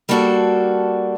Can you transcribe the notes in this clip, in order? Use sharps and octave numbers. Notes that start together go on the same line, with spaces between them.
G3 A#3 D4 F#4 A4